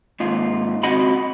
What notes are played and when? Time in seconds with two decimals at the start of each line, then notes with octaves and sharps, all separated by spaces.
0.20 D#2 G#2 F4
0.83 C#2 C4 F#4 D#5 F#5 B5